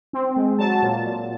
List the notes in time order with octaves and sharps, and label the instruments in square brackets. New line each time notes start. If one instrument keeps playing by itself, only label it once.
[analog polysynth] C4
G#3
F#3 A5
A#2
A#2